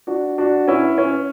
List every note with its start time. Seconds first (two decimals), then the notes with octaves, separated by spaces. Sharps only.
0.07 D4 F#4
0.38 D4 F#4
0.68 C#4 E4
0.98 C#4